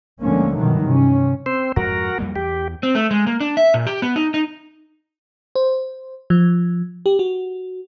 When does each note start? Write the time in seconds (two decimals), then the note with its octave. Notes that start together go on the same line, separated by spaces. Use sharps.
0.21 D2 D3 F3 G#3 A#3 C#4
0.55 G2 B2 D#3 E3 F#3 A3
0.86 C3 C#4
1.46 C4 C5
1.76 F2 G#2 F#4 A#4
2.18 F2 G3 A#3
2.36 E2 G4
2.83 C4
2.95 A3
3.11 G#3
3.27 A#3
3.40 D4
3.57 E5
3.74 A#2
3.87 G4
4.02 B3
4.16 D#4
4.34 D#4
5.55 C5
6.30 F3
7.06 G4
7.19 F#4